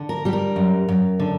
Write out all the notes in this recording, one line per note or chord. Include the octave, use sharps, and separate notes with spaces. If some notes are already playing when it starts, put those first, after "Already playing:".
Already playing: D3
A#4
G3 G4
A#4
F#2
F#2
D3